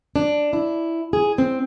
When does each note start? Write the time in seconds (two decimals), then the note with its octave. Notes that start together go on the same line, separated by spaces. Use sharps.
0.16 D4
0.53 E4
1.13 G#4
1.38 C4